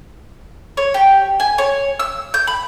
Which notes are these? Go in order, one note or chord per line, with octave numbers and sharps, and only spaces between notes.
C#5
G4
G#5
C#5
E6
G6
B5